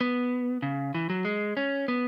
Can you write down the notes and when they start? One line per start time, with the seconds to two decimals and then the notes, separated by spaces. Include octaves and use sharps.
0.01 B3
0.62 C#3
0.95 E3
1.10 F#3
1.25 G#3
1.57 C#4
1.88 B3